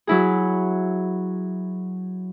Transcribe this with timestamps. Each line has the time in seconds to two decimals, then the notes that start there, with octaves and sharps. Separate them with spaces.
0.07 F#3 E4 G#4